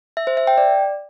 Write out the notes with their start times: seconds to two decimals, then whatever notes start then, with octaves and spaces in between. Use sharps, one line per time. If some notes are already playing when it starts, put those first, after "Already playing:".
0.17 E5
0.27 C5
0.37 E5
0.47 G5
0.58 D5